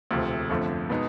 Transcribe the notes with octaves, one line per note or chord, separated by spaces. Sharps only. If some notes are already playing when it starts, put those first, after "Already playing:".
E1 D2 C3 F3 A3
G1 F2 D3 F3 A3
B2 G#3 B3 D#4